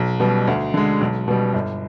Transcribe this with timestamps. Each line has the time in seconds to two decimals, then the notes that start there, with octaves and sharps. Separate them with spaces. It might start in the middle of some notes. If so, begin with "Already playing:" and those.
Already playing: B1
0.20 B2 G3
0.47 D2
0.74 D3 G#3
1.01 B1
1.28 B2 G3
1.53 G1